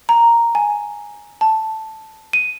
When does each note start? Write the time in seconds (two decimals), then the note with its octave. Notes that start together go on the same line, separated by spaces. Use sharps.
0.09 A#5
0.55 G#5
1.41 A5
2.33 D#7